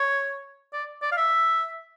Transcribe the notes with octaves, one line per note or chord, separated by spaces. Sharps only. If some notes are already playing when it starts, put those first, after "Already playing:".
Already playing: C#5
D5
D5
F5
E5